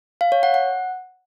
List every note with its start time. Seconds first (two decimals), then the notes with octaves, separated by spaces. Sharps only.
0.21 F5
0.32 C#5
0.43 F#5
0.54 F#5